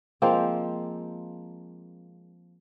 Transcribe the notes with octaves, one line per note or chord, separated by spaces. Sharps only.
F3 G#3 A#3 C4